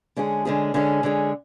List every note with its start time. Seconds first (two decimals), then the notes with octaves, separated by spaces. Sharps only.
0.16 D3 G#3 C#4 G#4
0.45 D3 G#3 C#4 G#4
0.74 D3 G#3 C#4 G#4
1.03 D3 G#3 C#4 G#4